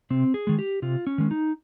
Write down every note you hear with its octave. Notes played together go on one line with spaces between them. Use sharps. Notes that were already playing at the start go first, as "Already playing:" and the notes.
C3 C4
G#4
D#3 G#3
G4
C3 F4
C#4
D#3 G#3
D#4